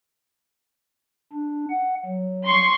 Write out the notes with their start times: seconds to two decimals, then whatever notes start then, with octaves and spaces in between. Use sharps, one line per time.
1.33 D4
1.70 F#5
2.05 F#3
2.45 C6 C#6